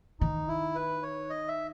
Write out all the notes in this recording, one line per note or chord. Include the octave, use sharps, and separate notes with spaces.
D#3 D#4
E4
B4
C#5
D#5
E5